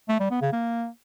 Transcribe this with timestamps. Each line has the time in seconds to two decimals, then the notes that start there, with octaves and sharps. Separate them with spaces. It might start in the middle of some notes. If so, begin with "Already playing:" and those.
0.09 A3
0.20 G3
0.31 B3
0.42 C#3
0.52 A#3